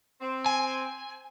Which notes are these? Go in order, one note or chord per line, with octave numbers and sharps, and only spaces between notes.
C4
G#5